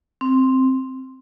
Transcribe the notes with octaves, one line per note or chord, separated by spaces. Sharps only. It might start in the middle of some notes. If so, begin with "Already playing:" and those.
C4